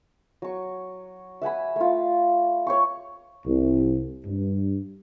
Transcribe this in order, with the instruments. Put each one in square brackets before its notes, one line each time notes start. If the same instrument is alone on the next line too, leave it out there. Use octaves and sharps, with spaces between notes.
[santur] F#3 C#6
E5 F#5 G#5 B5
A3 F4
C#5 G5 C#6
[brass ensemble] C2
G2